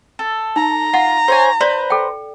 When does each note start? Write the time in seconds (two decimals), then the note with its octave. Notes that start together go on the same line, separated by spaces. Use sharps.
0.19 A4
0.56 D#4 A#5
0.94 F4 F#5
1.28 C5 C#5 G#5
1.61 B4 C5 D5
1.90 A4 G5